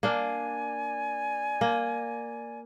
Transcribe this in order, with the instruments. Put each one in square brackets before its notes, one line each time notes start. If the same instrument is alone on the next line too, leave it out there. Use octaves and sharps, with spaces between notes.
[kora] A#3 D4 F5 [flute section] D5 G#5
[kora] A#3